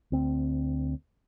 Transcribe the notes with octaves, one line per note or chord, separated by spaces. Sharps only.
D2 C4